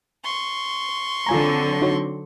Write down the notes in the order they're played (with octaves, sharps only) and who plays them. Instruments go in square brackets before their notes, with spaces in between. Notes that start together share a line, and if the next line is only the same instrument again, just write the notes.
[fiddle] C6 C#6
[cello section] D3 F#3 C4 [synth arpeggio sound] F4 G#5 A#5
[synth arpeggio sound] D#4 F#4 C#5